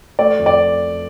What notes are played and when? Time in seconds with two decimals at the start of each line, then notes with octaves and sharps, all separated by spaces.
0.19 A3 D5
0.39 F2
0.46 D5